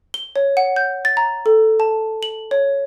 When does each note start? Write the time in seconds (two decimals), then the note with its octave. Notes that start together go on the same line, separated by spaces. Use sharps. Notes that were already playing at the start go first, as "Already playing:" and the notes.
0.14 G7
0.36 C#5
0.57 F#5
0.76 G6
1.05 A6
1.17 A#5
1.46 A4
1.80 A5
2.23 F#7
2.51 C#5